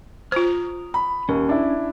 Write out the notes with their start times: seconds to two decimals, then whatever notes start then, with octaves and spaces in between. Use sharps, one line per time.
0.32 F4 C5 A#5 D#6 F6
0.94 B5
1.29 D#2 C#4
1.49 D4 E4